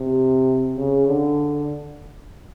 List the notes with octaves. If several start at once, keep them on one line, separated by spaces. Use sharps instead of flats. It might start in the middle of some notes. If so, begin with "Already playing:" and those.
Already playing: C3
C#3
D3